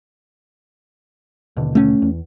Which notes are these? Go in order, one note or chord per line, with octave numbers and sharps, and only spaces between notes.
D#2 B2 D3
A3 C#4
E2